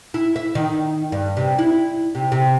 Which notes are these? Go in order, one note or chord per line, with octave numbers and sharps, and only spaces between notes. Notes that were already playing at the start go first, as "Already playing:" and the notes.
E4
E5
D#3
G2
C3
E4
C3
C3